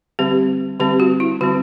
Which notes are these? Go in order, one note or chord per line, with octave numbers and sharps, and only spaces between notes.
D3 G3 C4 G4
D3 G3 C4 G4
F#4
E4
D3 G3 C4 F#4